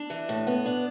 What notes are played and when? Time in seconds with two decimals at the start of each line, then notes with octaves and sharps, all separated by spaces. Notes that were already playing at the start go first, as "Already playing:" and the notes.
Already playing: D4
0.10 E3
0.29 A2
0.47 B3
0.66 D4